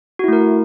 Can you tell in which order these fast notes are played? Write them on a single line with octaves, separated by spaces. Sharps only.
F#4 E4 A3 A#4